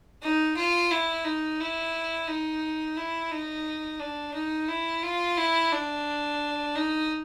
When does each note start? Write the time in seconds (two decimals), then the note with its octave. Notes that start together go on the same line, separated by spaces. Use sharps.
0.22 D#4
0.57 F4
0.91 E4
1.25 D#4
1.60 E4
2.28 D#4
2.97 E4
3.31 D#4
4.00 D4
4.34 D#4
4.68 E4
5.03 F4
5.37 E4
5.71 D4
6.75 D#4